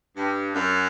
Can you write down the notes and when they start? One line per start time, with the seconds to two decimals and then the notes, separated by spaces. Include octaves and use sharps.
0.16 G2
0.54 F#2